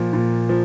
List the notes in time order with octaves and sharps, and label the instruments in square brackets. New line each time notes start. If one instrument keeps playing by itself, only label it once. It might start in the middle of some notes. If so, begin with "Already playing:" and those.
Already playing: [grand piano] A#2 F3
A#2
F3